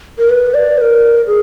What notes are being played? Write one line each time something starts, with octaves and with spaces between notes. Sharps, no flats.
A#4
B4
D5
B4
A#4
G#4